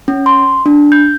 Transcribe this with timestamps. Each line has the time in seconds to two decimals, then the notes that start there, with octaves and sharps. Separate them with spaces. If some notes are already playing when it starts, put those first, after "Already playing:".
0.08 C#4
0.26 C6
0.66 D4
0.92 G6